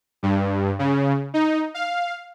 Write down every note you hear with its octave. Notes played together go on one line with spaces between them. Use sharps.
G2
C#3
D#4
F5